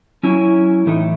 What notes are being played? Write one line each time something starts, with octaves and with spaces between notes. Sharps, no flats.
F#3 C#4 E4
A2 E3 A3 D#4